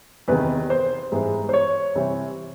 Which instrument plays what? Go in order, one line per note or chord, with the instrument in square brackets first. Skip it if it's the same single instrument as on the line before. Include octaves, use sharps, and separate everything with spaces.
[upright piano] E2 C3 D#3 B4
C5
G#2 E3 G3 B3
C5
C#5
C3 E3 G3 C4